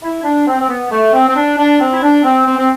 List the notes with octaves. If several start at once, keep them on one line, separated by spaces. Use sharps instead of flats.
E4
D4
C4
C4
B3
A3
C4
C4
D4
D4
C4
E4
D4
C4
C4
C4